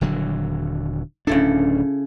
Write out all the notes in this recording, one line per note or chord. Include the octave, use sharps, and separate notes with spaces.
D#1 D3 F#3
D1 C#3 D4 E4 A4